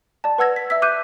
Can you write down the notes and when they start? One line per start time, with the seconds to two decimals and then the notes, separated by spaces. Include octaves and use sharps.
0.24 D5 A5
0.38 B4 F#5 E6 G#6 A#6
0.56 B6
0.70 E5 E6 B6
0.82 D6 F#6 G6 D#7